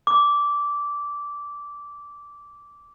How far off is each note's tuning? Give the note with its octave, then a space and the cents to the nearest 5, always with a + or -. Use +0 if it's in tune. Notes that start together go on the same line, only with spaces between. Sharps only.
D6 -15